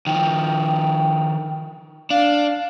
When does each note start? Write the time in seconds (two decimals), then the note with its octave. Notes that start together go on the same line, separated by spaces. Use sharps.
0.07 D#3 F3 G5
2.10 D4 F5